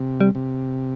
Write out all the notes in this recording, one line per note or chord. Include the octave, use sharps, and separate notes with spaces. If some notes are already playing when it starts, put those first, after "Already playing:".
Already playing: C3
G3
C3